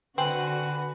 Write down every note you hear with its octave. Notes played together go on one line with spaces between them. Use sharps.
D3 C4 F#4 B4 G#5 F#7